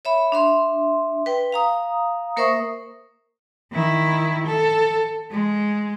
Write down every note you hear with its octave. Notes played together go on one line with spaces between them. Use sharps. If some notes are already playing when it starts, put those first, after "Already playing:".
C#5 E5 B5
D4 E5 C6
B4 G5
F5 A#5 D#6
A#3 A#4 C5 E5 C#6 D#6
D#3 E4
A4
G#3